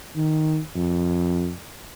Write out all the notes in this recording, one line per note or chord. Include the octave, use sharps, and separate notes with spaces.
D#3
F2